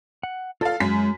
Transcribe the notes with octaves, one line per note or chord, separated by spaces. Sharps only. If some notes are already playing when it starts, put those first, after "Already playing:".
F#5
F4 A4 D5 F5 A5
F#2 G#3 B6